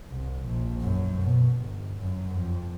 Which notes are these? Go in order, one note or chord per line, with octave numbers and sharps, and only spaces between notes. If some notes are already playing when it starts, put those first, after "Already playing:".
C2
A#1
F#2
B2
G1
F#2
F2